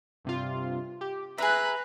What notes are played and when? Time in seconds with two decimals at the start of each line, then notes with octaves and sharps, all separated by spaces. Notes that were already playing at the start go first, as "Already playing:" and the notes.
0.25 G2 C3 F4
1.01 G4
1.38 G#4 B4 E5 A#5 F#6